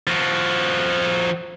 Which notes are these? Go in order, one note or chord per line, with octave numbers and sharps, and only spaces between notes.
F3 F#4